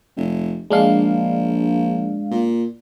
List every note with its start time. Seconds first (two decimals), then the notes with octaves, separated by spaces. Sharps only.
0.16 F1
0.70 A#1 G#3 D4 F5
2.31 A#2